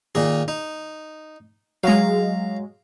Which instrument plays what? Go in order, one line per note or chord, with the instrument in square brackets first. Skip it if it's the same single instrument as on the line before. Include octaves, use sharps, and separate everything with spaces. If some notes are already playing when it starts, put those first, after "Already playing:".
[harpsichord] A#2 D#3 G#4
D#4
[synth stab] F#3 G#3 [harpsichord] F5 A#5